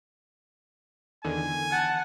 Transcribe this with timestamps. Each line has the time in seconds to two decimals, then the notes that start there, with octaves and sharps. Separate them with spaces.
1.25 E2 D3 D#3 G#5
1.72 F#5 A5